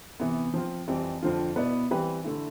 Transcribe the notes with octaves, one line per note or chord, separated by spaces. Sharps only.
C3 E3 B3
F3 C4 F4
F2 E3 G3 C4
F2 D3 F3 C4 F4
B2 B3 E4 B4 D5
E3 G3 C4 G4 B4
D3 A3 E4